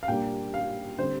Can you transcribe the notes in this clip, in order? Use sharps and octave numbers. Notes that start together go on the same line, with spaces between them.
F5
A#2 G3 A#3 D4 G5
F5
D3 G3 C4 C5